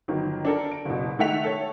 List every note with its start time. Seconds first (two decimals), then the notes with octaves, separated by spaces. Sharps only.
0.08 G1 D#3 F#3
0.45 D4 A4 A#4
0.72 D7
0.85 F#1 B2
1.19 D#3 A3 E5 F#5 B6 F7
1.44 A4 C#5